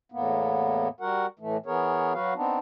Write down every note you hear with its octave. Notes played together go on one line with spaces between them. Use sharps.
E2 A2 A#3 B3
G3 F#4 A#4 F#5
A2 E3 A3
E3 B3 G#4 A#4 C#5
F#3 F#4 B4 F5
B3 C4 D4 D#4